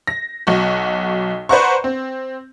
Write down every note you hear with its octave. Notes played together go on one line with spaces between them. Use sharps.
A#6
B1 F#4
B4 C5 D5 F#5 A#5 C#6
C4